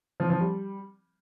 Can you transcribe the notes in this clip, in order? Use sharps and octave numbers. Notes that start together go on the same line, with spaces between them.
F3
F3
G3